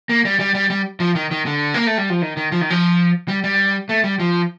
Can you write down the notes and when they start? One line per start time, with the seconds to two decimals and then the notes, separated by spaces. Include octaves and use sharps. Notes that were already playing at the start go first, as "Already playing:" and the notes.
0.09 A#3
0.25 G3
0.40 G3
0.54 G3
0.70 G3
1.00 F3
1.15 D#3
1.31 D#3
1.46 D3
1.74 A#3
1.87 A3
1.98 G3
2.10 F3
2.22 D#3
2.37 D#3
2.52 F3
2.61 D#3
2.70 F3
3.28 G3
3.44 G3
3.89 A3
4.04 G3
4.20 F3